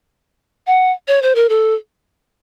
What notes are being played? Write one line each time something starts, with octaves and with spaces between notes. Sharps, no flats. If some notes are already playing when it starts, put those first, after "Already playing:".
F#5
C#5
C5
A#4
A4